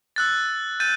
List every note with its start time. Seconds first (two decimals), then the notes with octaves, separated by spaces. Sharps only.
0.16 E6 F#6 A6
0.80 G6 A6 D#7